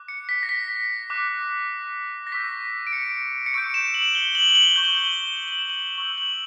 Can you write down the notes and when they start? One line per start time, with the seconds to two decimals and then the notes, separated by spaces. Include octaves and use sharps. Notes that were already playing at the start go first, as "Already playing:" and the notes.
Already playing: D6 F#6
0.08 C#7
0.29 B6
0.43 A#6
0.49 B6
1.10 D6 F#6
2.27 A#6
2.32 C#6 E6 G6 B6
2.87 D7
2.93 C#7
3.46 C#7
3.54 C#6 E6 G6 D7
3.74 E7
3.94 F#7
4.15 G7
4.35 F#7
4.50 F#7
4.55 G7
4.76 C#6 G6 G7
4.85 F#7
4.95 G7
5.37 G7
5.48 F#7
5.58 E7
5.70 F#7
5.98 C#6 E6 G6 F#7
6.18 F#7